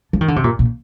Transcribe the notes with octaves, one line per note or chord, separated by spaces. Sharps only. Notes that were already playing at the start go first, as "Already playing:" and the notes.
F3
D#3
D3
C3
A#2
A#2